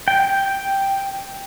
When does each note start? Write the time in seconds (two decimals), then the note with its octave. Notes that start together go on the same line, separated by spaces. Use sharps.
0.08 G5